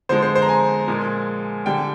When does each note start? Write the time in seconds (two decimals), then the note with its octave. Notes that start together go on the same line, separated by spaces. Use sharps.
0.09 D3 F3 G#3 C5
0.22 C5
0.35 C5
0.42 A#5
0.49 G#5
0.88 A#2 F3 G#3
1.66 D3 G3 G5